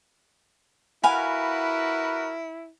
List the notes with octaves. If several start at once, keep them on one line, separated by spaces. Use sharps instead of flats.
E4 F#4 A#4 B4 F5 F#5 G#5 B5